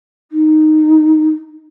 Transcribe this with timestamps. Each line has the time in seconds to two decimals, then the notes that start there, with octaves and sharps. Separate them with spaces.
0.31 D#4